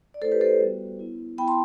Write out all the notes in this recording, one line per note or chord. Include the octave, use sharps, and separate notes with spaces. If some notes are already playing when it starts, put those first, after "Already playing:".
D5
A3 E4 A4 C5
G4 B4
A4 C5
G3 B3 F#4
B3 E4
B3 E4 G5 B5
A5 C6